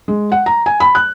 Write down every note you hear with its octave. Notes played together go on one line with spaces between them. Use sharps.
G#3
F#5
A#5
G#5
B5
F#6